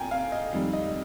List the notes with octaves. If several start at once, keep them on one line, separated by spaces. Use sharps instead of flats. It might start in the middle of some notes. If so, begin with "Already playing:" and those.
Already playing: A#2 G5 G#5 A#5
F5
D#5
F2 D#3 G3
D#5